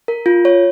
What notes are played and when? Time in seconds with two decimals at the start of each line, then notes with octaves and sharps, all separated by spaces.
0.08 A#4
0.26 F4
0.45 C#5